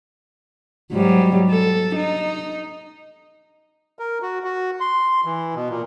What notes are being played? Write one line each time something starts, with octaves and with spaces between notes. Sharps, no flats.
G#2 F#3 G3
A4
D#4
A#4
F#4
F#4
C6
E3
B2
A#2